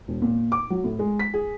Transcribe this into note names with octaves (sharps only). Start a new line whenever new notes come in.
E1
A#2
D6
F#3
A2
G#3
B6
G#4